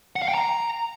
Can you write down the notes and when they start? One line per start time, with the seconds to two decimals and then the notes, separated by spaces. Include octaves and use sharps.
0.16 F#5
0.22 F5
0.28 G5
0.34 A#5